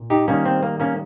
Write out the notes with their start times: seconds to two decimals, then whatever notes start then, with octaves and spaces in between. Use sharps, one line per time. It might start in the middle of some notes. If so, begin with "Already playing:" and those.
Already playing: A#2
0.10 D#4 G4
0.28 D#3 G3 A#3 C#4
0.45 C4
0.63 A#3
0.80 A#3 C#4